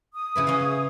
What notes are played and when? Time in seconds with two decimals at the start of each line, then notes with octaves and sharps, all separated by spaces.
0.14 D#6
0.35 C#3 E4 B4
0.47 C#4 F5